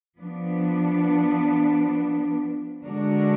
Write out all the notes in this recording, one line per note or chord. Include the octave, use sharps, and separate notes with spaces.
F3 B3 D4
D3 G#3 D4 F#4 A#4